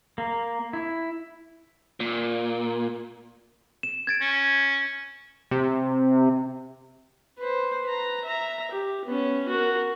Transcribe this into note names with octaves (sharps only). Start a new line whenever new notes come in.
A#3
E4
A#2
E7
G#6 A6 D7
C#4
C3
B4 C5
B4 A#5
E5 A#5
G4
B3 C#4
F#4 A#4